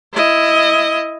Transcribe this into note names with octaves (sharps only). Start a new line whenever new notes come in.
E4 D#5